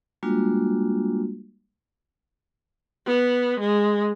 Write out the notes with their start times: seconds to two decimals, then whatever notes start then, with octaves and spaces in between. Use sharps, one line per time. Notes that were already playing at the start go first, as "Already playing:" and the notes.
0.23 G3 G#3 A#3 D4 F4 F#4
3.07 B3
3.60 G#3